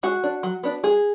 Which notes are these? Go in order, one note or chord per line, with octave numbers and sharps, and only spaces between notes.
G#3 F#4
D4
F#3
B3 D4
G#3 G#4